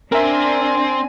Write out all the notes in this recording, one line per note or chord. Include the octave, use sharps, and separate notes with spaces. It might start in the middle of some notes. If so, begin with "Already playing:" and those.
C4 D4 A#4 E5 G#5